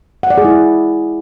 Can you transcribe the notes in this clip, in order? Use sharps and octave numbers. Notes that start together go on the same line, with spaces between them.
F#5
D5
G#4
E4